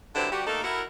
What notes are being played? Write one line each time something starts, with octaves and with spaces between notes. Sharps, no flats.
D3 F#3 C4 E4 G4 B4
G3 F#4 G4
A3 A#3 D#4 A4
E4 F#4 A#4